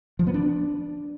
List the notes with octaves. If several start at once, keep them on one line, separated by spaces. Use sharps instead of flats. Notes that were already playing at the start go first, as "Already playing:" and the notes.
F3
B3
D4